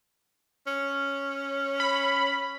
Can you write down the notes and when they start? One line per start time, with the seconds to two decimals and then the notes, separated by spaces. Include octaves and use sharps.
0.67 C#4
1.80 B5